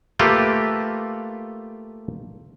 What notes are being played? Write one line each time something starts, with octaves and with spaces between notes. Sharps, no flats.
A3 A#3 F4 G4 A4 B4